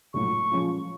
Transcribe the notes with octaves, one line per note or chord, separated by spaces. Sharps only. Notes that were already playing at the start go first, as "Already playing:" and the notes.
A#1 A2 F#3 C#6
A#2 F3 G#3 C#4 F4